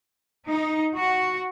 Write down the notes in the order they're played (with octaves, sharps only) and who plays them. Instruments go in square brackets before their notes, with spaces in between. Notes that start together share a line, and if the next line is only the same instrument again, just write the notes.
[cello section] D#4
F#4